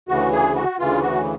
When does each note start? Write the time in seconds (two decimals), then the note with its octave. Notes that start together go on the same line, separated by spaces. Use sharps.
0.09 D2 C#3 E3 F#4
0.32 G#4
0.56 F#4
0.79 D2 C#3 E3 F4
1.02 F#4